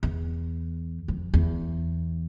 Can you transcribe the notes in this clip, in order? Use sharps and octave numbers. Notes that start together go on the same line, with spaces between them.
E2
F2
E2